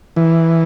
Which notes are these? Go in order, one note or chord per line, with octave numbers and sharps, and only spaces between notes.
E3